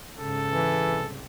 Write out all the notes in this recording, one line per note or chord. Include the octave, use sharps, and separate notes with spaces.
G#2 C#3 A4
E3
C2